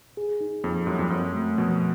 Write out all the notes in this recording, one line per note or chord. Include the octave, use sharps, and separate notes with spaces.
G#4
D#4
F2 A#3
F#2 G3
F2
F#2 C4
A3
B2 F3